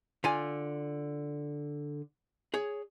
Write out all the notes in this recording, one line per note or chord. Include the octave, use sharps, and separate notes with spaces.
D3 F4 G#5
G#4 C#5